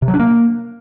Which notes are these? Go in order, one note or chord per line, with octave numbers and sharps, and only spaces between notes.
C3
F#3
D4
A#3